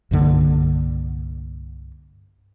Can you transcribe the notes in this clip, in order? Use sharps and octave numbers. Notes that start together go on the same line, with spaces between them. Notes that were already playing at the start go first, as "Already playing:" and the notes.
C2 G2 D3 A#3